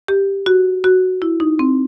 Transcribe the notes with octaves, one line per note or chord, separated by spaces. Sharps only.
G4
F#4
F#4
E4
D#4
C4